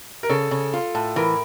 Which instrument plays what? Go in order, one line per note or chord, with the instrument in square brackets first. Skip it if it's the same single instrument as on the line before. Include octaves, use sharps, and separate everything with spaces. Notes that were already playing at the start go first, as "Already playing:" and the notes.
[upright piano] A#4
[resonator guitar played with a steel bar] C#3 [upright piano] A4
[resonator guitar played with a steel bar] C#3
F4
A2
[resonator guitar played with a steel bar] E3 [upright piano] A#4